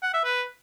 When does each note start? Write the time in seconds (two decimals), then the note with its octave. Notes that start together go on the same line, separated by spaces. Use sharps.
0.02 F#5
0.13 E5
0.24 B4